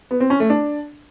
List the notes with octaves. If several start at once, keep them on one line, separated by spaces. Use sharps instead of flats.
B3
C4
C#4
A3
D4